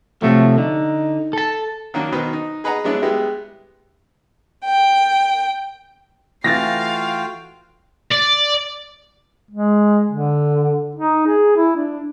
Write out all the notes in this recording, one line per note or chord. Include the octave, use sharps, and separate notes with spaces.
C3 F3 F#3 A3
D3 D#4
A4 A5
D#3 F#3 A#3 C#4 D4 F#4
B2 D#3 B4 C5
D#4
G#4 B4 D#5 F#5 A#5
F#3 G#3 B3 D4 E4
G3 G#3 B3 E4 G4
G5
E3 A3 F4 F#4 F5 G5 A6 A#6
D5
G#3
D3
D#4
G#4
E4
D4